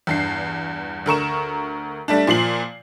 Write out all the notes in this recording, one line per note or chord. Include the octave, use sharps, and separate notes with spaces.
E2 G2 C7
D2 A#4 C#6 E7
G3 A3 D4
A#2 F3 C7 F#7